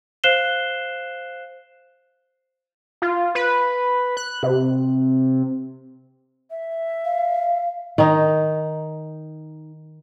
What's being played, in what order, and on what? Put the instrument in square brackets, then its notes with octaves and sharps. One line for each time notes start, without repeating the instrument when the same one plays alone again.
[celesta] C5 F5 F#6 C7 E7 G7
[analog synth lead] F4
B4
F#6
C3
[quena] E5
[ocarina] F5
[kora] D#3 D#4